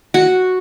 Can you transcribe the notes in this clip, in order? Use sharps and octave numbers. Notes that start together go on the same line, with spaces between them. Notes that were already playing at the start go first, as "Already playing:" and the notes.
F#4